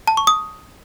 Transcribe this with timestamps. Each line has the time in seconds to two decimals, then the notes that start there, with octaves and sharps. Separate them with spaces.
0.07 A5
0.17 C#6
0.27 D#6